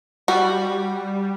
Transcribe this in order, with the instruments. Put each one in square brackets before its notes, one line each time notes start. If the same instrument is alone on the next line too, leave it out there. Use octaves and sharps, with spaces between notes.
[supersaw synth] G3 [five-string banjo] F#4